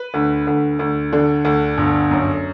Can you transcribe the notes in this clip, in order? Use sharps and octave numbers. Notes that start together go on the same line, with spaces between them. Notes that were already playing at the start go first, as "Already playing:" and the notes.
Already playing: B4
D2
D2
D2
D3
D2
G1
F#2